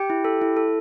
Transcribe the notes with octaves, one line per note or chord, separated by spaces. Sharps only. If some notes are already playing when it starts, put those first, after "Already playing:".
Already playing: G4 G5
E4
A4
E4
A4